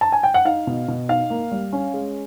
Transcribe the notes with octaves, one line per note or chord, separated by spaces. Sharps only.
A5
G#5
G5
F#5
D#4 F5
B2
B2
D#4 F5
A#3
G3
C#4
G#3